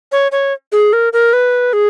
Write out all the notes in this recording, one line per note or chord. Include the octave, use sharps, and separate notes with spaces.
C#5
C#5
G#4
A#4
A#4
B4
G#4